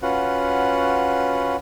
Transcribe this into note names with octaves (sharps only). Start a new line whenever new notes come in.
C#4 F4 F#4 B4 F#5